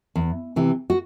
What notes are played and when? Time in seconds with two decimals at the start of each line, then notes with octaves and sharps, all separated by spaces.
0.16 E2
0.56 C3 E3
0.90 F#4